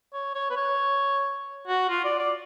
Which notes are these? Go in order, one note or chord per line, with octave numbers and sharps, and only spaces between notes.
C#5
C#5
B4
C#5
F#4
F4
D5
D5